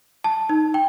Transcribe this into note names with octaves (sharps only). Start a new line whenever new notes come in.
A5
D#4
G5